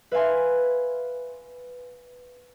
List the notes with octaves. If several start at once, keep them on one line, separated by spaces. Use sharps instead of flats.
B4 E5 F5 G#5 C6